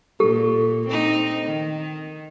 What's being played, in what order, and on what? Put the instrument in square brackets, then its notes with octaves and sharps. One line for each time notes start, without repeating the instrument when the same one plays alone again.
[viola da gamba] A#2 [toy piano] G4 A4
[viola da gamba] C4 D#4
D#3